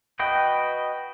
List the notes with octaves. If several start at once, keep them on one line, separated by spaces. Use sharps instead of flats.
F#4 B4 D#5 G5